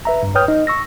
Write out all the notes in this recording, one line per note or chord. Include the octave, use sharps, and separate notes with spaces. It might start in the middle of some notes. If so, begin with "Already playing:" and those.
B4 E5 A#5
G2
B4 C#5 G5 D#6 F6 G6
D#4 D#5
C#6 E6 A#6